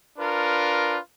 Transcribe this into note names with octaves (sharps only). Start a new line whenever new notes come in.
D4 F4 A#4 B4